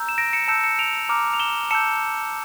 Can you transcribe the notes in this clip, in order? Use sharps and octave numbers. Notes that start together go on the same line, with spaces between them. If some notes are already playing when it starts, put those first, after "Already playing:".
Already playing: A#5 E6 G6
E7
A#6 D7
C#7 E7
A5 E6 G6 C#7 E7
C#7 E7
D7 F7
A#5 D6 F6
F7
E7 G7
A5 E6 G6 C#7 E7